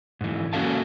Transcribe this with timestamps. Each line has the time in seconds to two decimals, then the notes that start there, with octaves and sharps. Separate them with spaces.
0.21 G#2 E3
0.53 A#3 C#4 F#4 A4 F5 A5